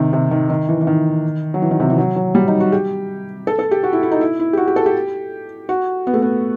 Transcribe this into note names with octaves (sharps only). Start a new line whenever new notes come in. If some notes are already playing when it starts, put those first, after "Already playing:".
Already playing: C3 D#3
C3
D#3
D#3
E3
E3
D#3
F#3
E3
D#3
C3
E3
F#3
F#3
G3
D#4
F#4
G4
A4
A4
G4
F#4
E4
E4
D#4
E4
E4
G4
F#4
G4
A4
G4
F#4
B3
A3
B3